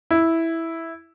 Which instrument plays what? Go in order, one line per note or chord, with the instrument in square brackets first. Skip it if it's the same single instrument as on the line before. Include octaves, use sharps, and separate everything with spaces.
[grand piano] E4